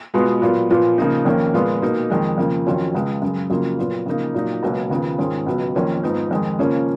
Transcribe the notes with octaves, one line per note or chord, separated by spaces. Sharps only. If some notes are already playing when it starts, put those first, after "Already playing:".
B2 G#3 B3 F4
A#2 F#3 B3 F4
A#2 F3 B3 F4
C#3 F3 A#3 D#4
F2 D#3 A#3 C#4
A#2 F3 G#3 B3 F4
B2 A#3 D#4
F2 D#3 G#3
F2 C#3 F3 A#3
F2 D#3 F#3 C#4 F4
C#2 C#3 G#3
F#2 C#3 G#3
F2 C#3 F#3 A#3 F4
A#2 F#3 B3 F4
C#3 F3 A#3 D#4
A#2 F#3 A#3 D#4
C#2 B2 F#3 A#3 C#4
D#2 C#3 F3 B3
G#2 D#3 G#3 C#4 F4
C#2 B2 F#3 B3
F2 D#3 A#3 C#4 F4
G#2 F3 B3 D#4
F2 D#3 G#3
C#3 F3 A#3 C#4